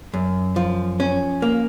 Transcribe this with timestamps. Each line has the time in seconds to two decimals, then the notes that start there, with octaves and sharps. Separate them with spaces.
0.14 F#2
0.56 F3
1.00 C#4
1.42 A#3